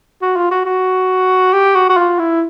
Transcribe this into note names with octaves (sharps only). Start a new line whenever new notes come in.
F#4
F4
F#4
F#4
G4
F#4
F#4
F4
E4